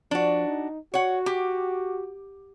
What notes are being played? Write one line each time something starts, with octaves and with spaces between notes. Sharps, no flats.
F3 D4 F#4
D#4
F#4 C#5 F#5
G4